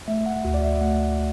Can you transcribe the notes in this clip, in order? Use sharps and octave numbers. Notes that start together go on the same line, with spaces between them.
A3 E5
F#5
D2 F#4
D5
E5
A3 F#5